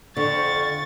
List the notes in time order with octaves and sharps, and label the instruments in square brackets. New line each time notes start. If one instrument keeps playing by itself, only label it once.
[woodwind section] F2 C#6 [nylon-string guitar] D3 [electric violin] A6